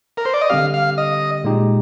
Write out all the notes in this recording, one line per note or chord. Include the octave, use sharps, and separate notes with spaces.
A#4
C5
D5
D#5
D3 G3 C4 G4 F5
F5
D#5
A#2 G#3 D#4 G4